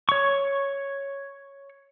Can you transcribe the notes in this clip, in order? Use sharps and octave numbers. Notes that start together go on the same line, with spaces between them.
C#5 C#6